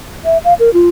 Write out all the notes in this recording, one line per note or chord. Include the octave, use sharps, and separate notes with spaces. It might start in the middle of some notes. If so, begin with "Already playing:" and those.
E5
F5
A#4
F4